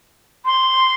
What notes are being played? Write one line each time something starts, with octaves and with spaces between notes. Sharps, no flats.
C6